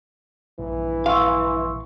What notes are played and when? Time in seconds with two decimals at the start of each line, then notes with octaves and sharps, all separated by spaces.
0.59 A#1 G2 E3
1.06 F5 C6 C#6 E6